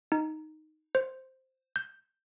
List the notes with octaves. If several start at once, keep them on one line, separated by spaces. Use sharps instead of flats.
D#4
C5
G6